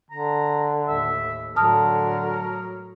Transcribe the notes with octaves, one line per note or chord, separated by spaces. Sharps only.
D3 A#5
D#2 A2 E5
A2 D3 F#3 A#4 A5 D#6 F6